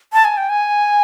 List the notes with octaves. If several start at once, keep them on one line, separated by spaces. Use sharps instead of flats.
A5
G#5
G5
G#5